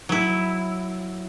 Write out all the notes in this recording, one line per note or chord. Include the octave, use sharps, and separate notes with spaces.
F#3 E4